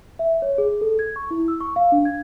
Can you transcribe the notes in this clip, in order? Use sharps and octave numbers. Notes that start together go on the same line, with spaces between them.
E5
C#5
G#4
A4
G#6
C#6
E4
E6
C#6
F5
D4
G#6